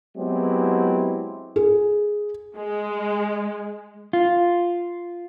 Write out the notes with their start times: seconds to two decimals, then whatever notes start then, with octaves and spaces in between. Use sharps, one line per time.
0.16 F#3 G#3 B3 C4 E4 G4
1.56 G#4
2.56 G#3
4.13 F4